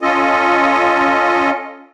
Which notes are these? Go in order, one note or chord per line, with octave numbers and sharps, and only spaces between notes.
C#4 F4 A4 D#5